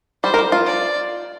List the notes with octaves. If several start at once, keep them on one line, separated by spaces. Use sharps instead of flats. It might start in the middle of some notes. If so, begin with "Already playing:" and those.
G3 C5
A#4
G4
F4
D5